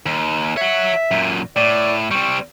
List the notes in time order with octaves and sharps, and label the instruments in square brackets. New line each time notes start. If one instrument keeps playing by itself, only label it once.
[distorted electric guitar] D#2
[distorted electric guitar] C#5 F#5 [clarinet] E5
[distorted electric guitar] F#2 A#2
[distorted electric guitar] A2 [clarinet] D5
[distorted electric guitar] G3 C4 [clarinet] C#6